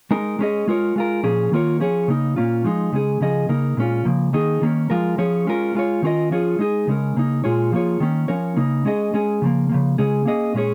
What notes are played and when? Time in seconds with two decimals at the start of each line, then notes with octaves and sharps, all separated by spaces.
0.11 G#3 D#4 A#4
0.39 G#3 C#4 G#4 D#5
0.68 G#3 F4 A#4 C#5
0.96 G#3 F4 A#4
1.23 A#2 F3 C#4 G#4
1.52 D#3 A#3 F4 A#4 C#5
1.80 F3 C#4 G#4 C#5
2.08 C#3 A#3 D#4
2.36 A#2 A#3 C#4 F4
2.64 F3 G#3 D#4
2.92 C#3 G#3 C#4 G#4
3.21 C#3 F3 C#4 G#4 D#5
3.49 C#3 A#3 D#4 A#4
3.77 A#2 G#3 C#4 F4
4.05 C#3 F3 A#3
4.33 D#3 A#3 D#4 G#4
4.62 D#3 A#3 C#4
4.90 F3 G#3 F4 A#4
5.18 F3 C#4 G#4 C#5
5.47 G#3 C#4 F4 A#4
5.75 G#3 F4 C#5
6.02 D#3 C#4 F4 A#4 D#5
6.31 F3 C#4 F4 G#4 C#5
6.59 G#3 D#4 G#4
6.87 C#3 G#3 C#4 A#4
7.16 C#3 A#3 D#4
7.44 A#2 G#3 F4 G#4 C#5
7.72 F3 A#3 F4 G#4 C#5
8.00 D#3 A#3 C#4
8.28 F3 C#4 A#4 C#5
8.57 C#3 A#3 D#4
8.85 G#3 C#4 G#4 D#5
9.14 G#3 C#4 G#4
9.42 C#3 F3 A#3
9.69 C#3 F3 A#3
9.98 C#3 G#3 C#4 G#4
10.25 A#3 C#4 G#4 D#5
10.54 A#2 G#3 C#4 G#4 C#5